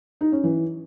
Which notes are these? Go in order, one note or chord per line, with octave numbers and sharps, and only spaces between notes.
D#4
C#4
E3